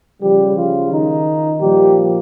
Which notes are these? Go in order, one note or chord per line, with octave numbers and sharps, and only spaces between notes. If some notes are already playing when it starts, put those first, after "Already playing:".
C#3 F3 G3 G4
F3 F4
D#3 D#4
A#2 F3 G3 G4